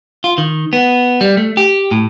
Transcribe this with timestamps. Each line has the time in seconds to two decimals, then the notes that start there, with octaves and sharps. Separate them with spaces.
0.24 F4
0.38 D#3
0.73 B3
1.21 G3
1.37 A3
1.57 G4
1.91 A2